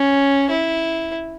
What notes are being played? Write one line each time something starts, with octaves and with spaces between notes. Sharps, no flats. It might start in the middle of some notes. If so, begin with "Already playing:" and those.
Already playing: C#4
E4